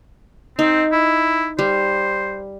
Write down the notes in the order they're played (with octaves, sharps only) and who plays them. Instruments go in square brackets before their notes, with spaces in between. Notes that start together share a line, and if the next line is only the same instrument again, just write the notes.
[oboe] C4 [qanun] D#4
[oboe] E4
[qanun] G3 [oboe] C5